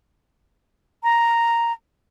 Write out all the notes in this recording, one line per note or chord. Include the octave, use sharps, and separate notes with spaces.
A#5